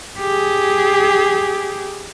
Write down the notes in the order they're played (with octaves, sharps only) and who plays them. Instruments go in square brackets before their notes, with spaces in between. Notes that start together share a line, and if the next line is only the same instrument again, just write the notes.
[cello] G4 G#4